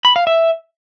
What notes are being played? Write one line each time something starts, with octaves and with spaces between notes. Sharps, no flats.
B5
F5
E5